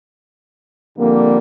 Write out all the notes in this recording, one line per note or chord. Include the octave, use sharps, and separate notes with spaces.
F2 D3 G3 A#3